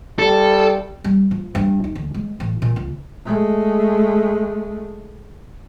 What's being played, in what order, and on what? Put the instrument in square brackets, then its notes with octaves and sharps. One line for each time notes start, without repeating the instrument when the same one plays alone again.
[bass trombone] G3 [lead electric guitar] A4
[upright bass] G3
F3
G2
D#4
D2
G#3
A1
A#2
C#2
[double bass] G#3 A3